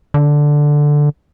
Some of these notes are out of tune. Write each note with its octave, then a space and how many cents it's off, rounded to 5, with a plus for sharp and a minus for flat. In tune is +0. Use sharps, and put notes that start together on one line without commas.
D3 +0